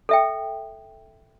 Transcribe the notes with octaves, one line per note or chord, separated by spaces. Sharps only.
A4 E5 G5